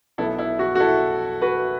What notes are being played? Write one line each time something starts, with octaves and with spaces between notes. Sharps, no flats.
B1 B2 B3 E4 A4
E4
F#4
F#4
E4 A4
F#4 B4